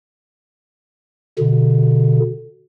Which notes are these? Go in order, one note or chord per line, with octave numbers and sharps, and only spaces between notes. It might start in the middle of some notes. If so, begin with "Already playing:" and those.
B2 D3